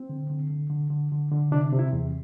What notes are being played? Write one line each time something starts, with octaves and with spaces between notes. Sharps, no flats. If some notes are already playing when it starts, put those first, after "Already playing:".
Already playing: C4
D3
D3
D3
D3
D3
D3
D3
C3 D4
C3
E4
E2